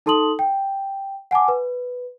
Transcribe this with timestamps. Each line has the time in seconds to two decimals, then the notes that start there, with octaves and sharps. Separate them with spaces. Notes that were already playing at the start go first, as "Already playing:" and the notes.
0.06 D#4 A4 A5 C6 D#6 F#7
0.39 G5
1.31 F#5 G#5 A5 D6
1.48 B4